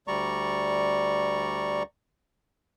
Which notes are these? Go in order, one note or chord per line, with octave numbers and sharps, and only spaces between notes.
D2 G3 D5 A#5 C#6